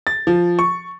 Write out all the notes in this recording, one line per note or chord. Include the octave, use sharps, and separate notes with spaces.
A6
F3
C#6